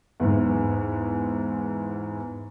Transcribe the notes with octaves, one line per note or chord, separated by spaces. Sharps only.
E2 G#2